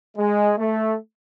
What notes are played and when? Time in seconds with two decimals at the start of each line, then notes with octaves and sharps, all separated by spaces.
0.18 G#3
0.58 A3